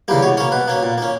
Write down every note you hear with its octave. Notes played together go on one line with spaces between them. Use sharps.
C#3 E3 G3 A#3
B2 C#5
A#3 C#4 C#5
B2 B4
A#3 C#4
A#2
A#3 C#4